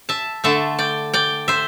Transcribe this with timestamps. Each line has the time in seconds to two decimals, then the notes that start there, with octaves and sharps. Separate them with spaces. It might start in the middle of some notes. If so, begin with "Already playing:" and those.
0.09 E5 A5
0.44 D3 A3 E5 A5
0.79 D5 G5
1.13 D5 G5
1.48 C5 E5